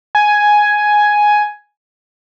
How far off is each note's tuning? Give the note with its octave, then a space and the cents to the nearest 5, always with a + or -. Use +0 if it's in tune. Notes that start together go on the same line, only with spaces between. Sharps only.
G#5 +5